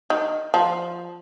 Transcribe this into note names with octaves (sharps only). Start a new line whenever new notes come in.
D#3
F3